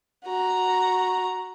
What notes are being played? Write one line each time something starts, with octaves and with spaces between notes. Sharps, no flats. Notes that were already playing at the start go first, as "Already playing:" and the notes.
F#4 A#5